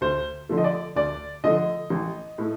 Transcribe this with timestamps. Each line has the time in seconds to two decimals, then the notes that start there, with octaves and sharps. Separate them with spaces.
0.01 D2 C5
0.49 D3 F3 A3
0.58 D#5
0.64 D5
0.96 D2 D5
1.44 D3 F3 A3 D#5
1.90 A1
2.38 A2 A3